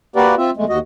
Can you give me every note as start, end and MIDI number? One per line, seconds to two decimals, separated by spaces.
0.16 0.35 58
0.16 0.35 66
0.16 0.35 67
0.16 0.35 70
0.16 0.35 71
0.16 0.35 74
0.38 0.50 60
0.38 0.50 65
0.38 0.50 76
0.57 0.65 40
0.57 0.65 56
0.57 0.65 57
0.69 0.79 39
0.69 0.79 66
0.69 0.79 75